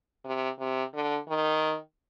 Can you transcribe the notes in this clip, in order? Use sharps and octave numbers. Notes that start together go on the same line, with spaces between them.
C3
C3
D3
D#3